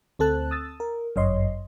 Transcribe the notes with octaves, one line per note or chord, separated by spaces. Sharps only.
D2 C4 A4 A5 F#6
D#6 E6 A6
A#4
G1 F#2 C#5 D#5 C6